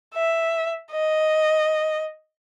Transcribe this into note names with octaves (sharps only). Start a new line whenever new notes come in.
E5
D#5